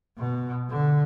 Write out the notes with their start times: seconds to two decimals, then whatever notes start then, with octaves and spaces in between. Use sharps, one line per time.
0.18 B2
0.70 D3